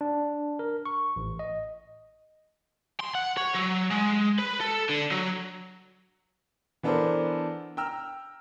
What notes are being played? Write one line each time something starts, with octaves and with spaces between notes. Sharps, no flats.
D4
A#4
C#6
A1
D#5
C6
F#5
C#5
F#3
G#3
B4
A4
D3
F#3
E3 B3 D4 A4 A#4 C5
G5 A#5 E6 F6